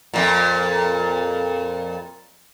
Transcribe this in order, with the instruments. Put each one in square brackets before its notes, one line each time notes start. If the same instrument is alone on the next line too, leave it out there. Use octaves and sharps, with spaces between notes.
[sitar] F2 A#2